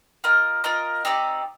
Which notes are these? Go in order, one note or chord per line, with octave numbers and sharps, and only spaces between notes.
F4 A#4 D#5
F4 A#4 D#5
C4 D#4 G4 D5